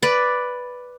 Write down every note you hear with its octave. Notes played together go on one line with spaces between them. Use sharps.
B4 D5